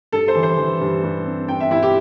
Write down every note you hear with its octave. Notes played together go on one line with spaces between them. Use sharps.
G2 A4
C5
E3
C5
E3
G2
G2
C4
C4 G5
E5
G2 E4
G4